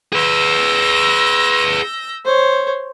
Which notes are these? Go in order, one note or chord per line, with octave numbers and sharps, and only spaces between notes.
G#4 B4 E6 G6 A#6
C5 C#5